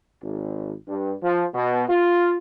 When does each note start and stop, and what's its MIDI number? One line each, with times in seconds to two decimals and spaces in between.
0.23 0.73 32
0.87 1.13 43
1.22 1.45 53
1.53 1.84 47
1.88 2.35 65